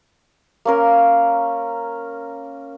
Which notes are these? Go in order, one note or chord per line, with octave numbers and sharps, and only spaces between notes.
A#3 C#4 A#4